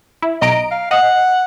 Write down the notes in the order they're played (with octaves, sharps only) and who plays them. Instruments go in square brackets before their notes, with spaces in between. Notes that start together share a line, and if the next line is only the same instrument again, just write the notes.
[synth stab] E4
[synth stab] B1 A#5 D7 [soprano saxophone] D#5
[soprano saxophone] F5
[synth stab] D#5 [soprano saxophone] F#5